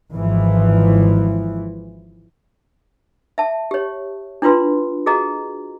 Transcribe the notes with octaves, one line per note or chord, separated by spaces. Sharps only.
G#1 E3 F3
E5 A5
G4 C#5
D4 E4 F4 B4 C6
F#4 G#4 A4 D#5 A#5